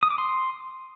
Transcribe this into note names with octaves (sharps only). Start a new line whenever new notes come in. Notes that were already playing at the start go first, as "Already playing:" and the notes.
D#6
D6
C6